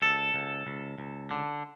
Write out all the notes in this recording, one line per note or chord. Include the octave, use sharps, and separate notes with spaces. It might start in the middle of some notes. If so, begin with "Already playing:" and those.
C#2 A4
C#2
C#2
C#2
D3